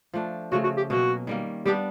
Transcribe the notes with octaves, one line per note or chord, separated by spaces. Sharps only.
F3 A3 D4
C#3 F3 A3 F#4
F#4
G4
B2 F#3 A#3 C#4 F#4
D#3 G3 A#3
G3 B3 D4 G4